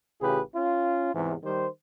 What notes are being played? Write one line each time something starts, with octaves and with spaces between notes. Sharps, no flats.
A1 C#3 F4 G4 G#4 B4
C#4 F4
E2 G#2 C3
D#3 G3 G4 C5